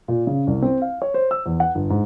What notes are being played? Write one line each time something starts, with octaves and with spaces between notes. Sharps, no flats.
A#2
C#3
C2
C4
F5
C#5
C5
E6
E2
F#5
G1
G#2